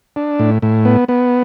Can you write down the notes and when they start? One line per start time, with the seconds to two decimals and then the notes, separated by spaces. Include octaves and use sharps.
0.16 D4
0.39 A2
0.62 A2
0.85 B3
1.09 B3